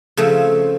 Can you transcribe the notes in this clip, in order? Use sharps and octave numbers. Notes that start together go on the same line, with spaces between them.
C#3 F3 A3 C4